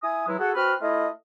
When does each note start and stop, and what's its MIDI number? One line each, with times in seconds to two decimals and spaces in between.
0.03 0.23 64
0.03 0.23 80
0.03 0.23 87
0.27 0.36 52
0.27 0.36 54
0.27 0.36 56
0.27 0.36 64
0.39 0.50 66
0.39 0.50 68
0.39 0.50 69
0.39 0.50 78
0.55 0.74 60
0.55 0.74 66
0.55 0.74 71
0.55 0.74 89
0.81 1.07 57
0.81 1.07 64
0.81 1.07 65
0.81 1.07 75